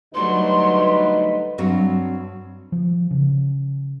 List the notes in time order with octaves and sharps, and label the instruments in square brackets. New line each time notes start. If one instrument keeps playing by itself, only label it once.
[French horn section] D2 D#4 B4 [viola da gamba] F#3 G3 A3 [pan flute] C6
[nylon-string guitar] G2 F#3 C4 C#5
[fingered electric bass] F3
C#3